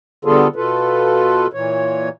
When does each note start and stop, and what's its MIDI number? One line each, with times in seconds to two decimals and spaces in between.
0.25 0.47 50
0.25 0.47 55
0.25 0.47 59
0.25 0.47 65
0.25 0.47 68
0.25 0.47 69
0.56 1.47 47
0.56 1.47 65
0.56 1.47 69
0.56 1.47 71
1.53 2.09 46
1.53 2.09 52
1.53 2.09 73